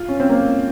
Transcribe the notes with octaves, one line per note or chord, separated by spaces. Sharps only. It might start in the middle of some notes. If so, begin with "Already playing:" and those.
Already playing: F4
C#4
C4
A#3